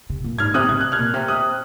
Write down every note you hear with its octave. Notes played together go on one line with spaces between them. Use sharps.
C3
A#2
G#2 F6 G#6
C3 D#6 F#6
C3 G#6
F#6
F6 G#6
A#2
C3
D#6 F#6